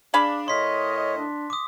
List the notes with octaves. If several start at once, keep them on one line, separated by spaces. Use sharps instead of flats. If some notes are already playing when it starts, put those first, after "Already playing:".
D4 G#4 F5 B5
A2 A#4 C#5 D#5 C6 B6
D4
D6 D#6